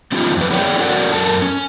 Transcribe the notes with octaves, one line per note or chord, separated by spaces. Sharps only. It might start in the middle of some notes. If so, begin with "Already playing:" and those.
G3 B3 C#4 D#4 F4 G4
F2 B4
B3 E4 G#4 C#5 D5 G5
C#4 F#4 A4 A#4 D5 F#5
F#2 A4 A#4 A5
C#4